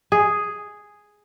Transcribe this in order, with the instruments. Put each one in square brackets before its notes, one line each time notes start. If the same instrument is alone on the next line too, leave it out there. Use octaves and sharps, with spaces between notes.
[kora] G#4